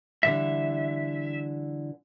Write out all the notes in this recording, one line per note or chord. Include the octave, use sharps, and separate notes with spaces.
D3 E3 G3 E5